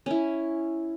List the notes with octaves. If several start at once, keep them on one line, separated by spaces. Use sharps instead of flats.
C#4 E4